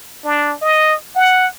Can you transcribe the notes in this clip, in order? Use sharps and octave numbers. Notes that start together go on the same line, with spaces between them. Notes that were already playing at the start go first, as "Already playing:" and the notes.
D4
D#5
F#5